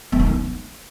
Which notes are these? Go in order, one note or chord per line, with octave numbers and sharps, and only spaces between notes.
B3
D#4
B3